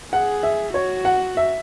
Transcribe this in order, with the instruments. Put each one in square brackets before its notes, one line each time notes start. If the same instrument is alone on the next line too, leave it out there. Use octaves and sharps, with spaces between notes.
[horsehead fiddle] G#4 [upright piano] F#5
[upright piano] E5
[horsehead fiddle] F#4 [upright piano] C#5
[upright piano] F#5
E5